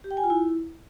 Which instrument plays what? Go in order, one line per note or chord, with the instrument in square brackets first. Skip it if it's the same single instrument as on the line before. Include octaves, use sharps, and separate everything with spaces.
[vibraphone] G4
G5
G#5
F4
E4